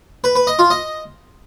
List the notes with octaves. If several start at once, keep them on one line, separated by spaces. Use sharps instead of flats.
B4
B4
D#5
F4
D#5